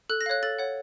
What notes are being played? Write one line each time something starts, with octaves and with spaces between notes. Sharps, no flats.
A4 F#6
A#6
C#5 F5 F#6
A4 A6
C#5 F#5